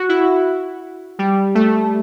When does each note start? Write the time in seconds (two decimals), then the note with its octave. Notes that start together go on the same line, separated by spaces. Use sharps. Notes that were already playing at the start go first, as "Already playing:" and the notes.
Already playing: F#4
0.09 E4
1.19 G3
1.55 A3